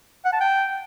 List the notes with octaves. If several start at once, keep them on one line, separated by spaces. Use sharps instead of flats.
F#5
A5
G5